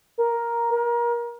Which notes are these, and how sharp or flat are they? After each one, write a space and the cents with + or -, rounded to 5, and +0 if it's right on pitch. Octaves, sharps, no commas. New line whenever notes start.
A#4 +5
A#4 +30